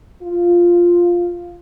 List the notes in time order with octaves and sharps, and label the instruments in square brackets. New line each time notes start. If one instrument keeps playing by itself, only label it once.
[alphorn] F4